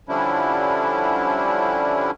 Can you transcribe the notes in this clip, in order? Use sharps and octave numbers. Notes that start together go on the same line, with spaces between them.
D3 F3 G3 C#4 D4 E4